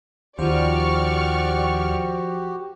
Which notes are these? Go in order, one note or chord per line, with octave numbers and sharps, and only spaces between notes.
D#2 F3 F#4 G4 C5 D5 C#6 F6